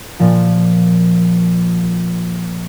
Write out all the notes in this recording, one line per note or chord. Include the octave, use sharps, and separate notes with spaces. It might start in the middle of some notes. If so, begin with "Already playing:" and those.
A#2 F3